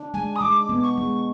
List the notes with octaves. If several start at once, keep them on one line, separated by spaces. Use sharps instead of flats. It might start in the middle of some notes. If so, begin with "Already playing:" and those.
Already playing: D4
G#3 G#5
D#6
G#3 D6
B3
C#6
G#3